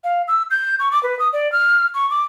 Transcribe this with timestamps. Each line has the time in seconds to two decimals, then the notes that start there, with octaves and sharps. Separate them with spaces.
0.04 F5
0.28 E6
0.51 G6
0.80 C#6
0.92 D6
1.03 B4
1.19 D#6
1.33 D5
1.52 F6
1.94 C#6
2.10 D6